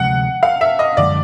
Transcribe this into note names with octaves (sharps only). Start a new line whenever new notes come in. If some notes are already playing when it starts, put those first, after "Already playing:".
Already playing: D2 C3 F3 G#3 F#5
F5
E5
D#5
F#2 D3 F3 G#3 D5